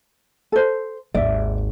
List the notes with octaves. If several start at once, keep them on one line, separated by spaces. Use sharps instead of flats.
A4 C5
G#1 D#2 D5 E5